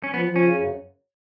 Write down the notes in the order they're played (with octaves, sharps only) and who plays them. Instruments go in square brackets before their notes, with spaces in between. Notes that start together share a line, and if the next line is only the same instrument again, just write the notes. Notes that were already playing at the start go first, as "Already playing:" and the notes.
[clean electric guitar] C#4
[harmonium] F3 [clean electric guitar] B3
[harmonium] F3
[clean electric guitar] C#4
[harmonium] C#3
F#2